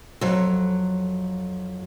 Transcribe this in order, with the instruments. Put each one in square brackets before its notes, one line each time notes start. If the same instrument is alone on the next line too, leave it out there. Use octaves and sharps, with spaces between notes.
[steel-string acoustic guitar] F2 F#3